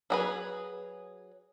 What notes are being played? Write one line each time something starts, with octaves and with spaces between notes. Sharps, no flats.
F#3 G#4 B4